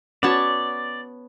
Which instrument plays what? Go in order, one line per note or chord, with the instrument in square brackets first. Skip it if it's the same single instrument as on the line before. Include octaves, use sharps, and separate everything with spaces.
[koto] B3 C#5 A5 [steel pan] C#4 F#4 [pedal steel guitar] D5